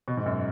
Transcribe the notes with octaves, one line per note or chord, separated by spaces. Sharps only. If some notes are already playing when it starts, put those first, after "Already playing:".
B2
G#2
F#2